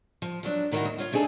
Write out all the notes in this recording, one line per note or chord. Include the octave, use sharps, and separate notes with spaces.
F3
F3 F#3 D4
A2 D#3 D#4 E4 F#4
D#2
F4 C#5 F5
A3 D4 D#4 F#4 G#4 A4